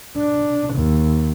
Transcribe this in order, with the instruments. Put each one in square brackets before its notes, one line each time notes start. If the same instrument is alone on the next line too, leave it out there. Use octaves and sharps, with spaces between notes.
[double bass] D4
D#2